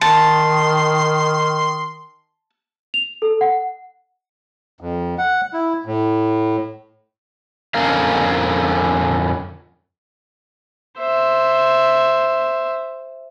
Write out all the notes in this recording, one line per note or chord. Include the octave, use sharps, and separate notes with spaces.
D#3 A5 C6
F7
A4
F#5
F2
F#5
E4
A2
F2 D3 C#4 A#4 F5
C5 E5